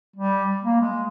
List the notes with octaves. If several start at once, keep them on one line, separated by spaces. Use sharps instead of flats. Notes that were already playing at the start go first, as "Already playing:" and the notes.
G3
A#3
G#3